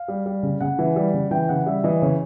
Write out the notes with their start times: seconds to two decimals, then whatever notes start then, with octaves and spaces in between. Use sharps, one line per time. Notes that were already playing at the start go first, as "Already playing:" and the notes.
Already playing: F5
0.08 G3
0.26 G3
0.43 C#3
0.60 C#3 F#5
0.79 E3
0.96 G3
1.14 C#3
1.31 E3 G5
1.49 C#3 F#5
1.66 G3 E5
1.84 E3 D#5
2.02 C#3 C#5